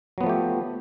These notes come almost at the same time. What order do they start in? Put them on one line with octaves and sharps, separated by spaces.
F#3 B3 F3 A3 G4